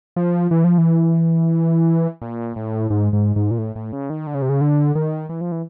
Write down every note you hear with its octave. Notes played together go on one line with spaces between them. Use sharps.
F3
E3
F3
E3
A#2
A2
G#2
G#2
G#2
A#2
A2
A2
C#3
D#3
D3
C#3
C3
C#3
D3
D#3
E3
F3
E3